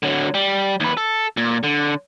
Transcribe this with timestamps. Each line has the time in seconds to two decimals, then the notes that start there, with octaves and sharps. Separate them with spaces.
0.03 D3 F#3
0.34 G3
0.80 D#2 B4
0.97 A4
1.37 A#2
1.63 D3